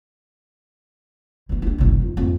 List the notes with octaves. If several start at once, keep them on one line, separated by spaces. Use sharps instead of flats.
E3 D4
D4 D#4
G1 C2
F2 D#4
F2 G#2